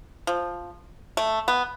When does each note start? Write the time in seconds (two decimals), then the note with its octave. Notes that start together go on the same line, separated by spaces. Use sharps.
0.27 F3
1.17 A3
1.48 B3